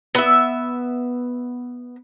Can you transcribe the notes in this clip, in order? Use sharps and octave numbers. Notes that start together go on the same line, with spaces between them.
B3 E5